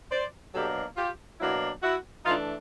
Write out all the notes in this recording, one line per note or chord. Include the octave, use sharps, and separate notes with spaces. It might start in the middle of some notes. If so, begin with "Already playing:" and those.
C5 D5
B2 F#3 A#3 D4 G4 A4
F4 G4
B2 F#3 A#3 D4 E4 F#4
E4 F#4
E3 A3 D4 D#4 F4